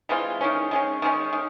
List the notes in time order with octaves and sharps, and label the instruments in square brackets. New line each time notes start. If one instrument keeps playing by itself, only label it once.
[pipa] E3 G#3 C4 F4
D#3 G#3 C#4
D#3 G#3 C#4
D#3 G#3 C#4
D#3